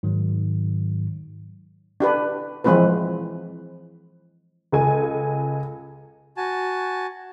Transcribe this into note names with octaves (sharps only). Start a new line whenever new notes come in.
G#2 D#3 F#3
D4 G4 B4
E3 F3 G#3 C4 F4 B4
C#2 A4 G#5
F#4 G#5 A5